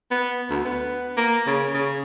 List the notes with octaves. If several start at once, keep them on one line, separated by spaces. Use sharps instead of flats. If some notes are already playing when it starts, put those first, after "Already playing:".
B3
D2
B3
A#3
C#3
C#3